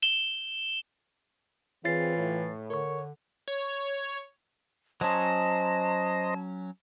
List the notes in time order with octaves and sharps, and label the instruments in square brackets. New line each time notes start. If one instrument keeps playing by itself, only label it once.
[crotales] E7 G7
[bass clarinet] E3 [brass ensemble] C4 G#4 [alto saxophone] F4 [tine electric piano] C#5 A6 C7
[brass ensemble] A2
[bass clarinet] D3 [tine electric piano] A#4 C#6 [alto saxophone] C#5
[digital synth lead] C#5
[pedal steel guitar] F#3 C#4 [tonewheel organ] C5 D#5 A#5 [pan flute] A5